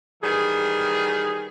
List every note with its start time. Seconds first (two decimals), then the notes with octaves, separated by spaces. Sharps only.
0.23 D#3 E3 G3 G#4